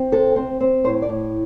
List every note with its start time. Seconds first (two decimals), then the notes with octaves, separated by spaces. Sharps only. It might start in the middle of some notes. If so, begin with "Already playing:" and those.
Already playing: C4
0.12 C3 A4
0.36 C4
0.60 C4
0.84 A2 C5
1.02 D5
1.09 A2